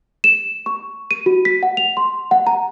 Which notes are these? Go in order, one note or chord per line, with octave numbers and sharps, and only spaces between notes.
E7
C#6
D#7
F#4
B6
F#5
F7
C6
F#5
A#5